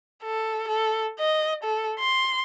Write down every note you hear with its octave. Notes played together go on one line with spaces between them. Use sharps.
A4
A4
D#5
A4
C6